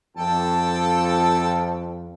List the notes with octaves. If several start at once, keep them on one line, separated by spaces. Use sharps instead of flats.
F2 A4 G5 A5